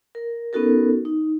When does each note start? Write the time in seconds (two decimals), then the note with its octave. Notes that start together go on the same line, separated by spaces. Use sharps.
0.15 A#4
0.53 B3 C#4 D#4 F#4 A4 A#4
1.05 D#4